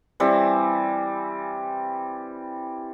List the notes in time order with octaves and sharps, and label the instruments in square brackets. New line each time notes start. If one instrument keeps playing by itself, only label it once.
[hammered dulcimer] E3 G3 C4